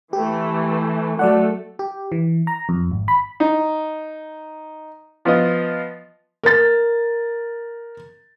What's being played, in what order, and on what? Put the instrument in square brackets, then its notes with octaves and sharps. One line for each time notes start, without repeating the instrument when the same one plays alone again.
[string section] E3 A3 [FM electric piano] G4
[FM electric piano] F#3 D5 F#5 [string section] A3 A4
[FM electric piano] G4
E3
A#5
F2
G#1
B5
[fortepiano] D#4
F3 B3 F4 D#5
[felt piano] A#4 A6